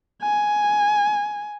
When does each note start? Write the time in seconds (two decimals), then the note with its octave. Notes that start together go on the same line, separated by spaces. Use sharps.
0.22 G#5